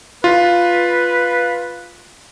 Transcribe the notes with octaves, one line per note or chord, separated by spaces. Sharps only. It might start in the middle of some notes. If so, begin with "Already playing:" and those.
F4 B4